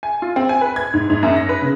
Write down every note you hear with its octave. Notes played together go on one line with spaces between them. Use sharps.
G#5
F4
C4
G#5
B4
G#6
G#2
G#2
F#2
A#6
B4
C#3